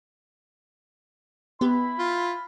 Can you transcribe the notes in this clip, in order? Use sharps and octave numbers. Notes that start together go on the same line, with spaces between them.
B3 E4 G4 B5
F4